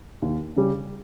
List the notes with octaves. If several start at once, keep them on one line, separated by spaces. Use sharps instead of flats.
D#2
C#3 G3 C#4